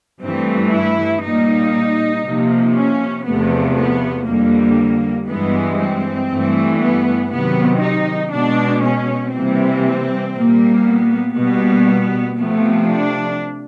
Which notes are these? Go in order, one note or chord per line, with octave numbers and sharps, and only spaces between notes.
G2 E3 A3 C4
E4
A#2 G3 A#3 D#4
C3 F3 A#3
C#4
E2 C3 F3 A3 B3
B3
F2 D3 G3 A#3
G2 E3 G#3 B3
C4
G2 E3 A3
B3
C3 D#3 F#3 B3
D#4
B2 G#3 D4
C#4
C3 E3 G3 A#3 C4
A#2 G3 A#3
B3
B2 G3 A#3 B3
C3 F3 A3 B3
D4